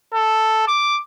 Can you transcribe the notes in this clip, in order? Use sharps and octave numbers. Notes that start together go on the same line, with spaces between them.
A4
D6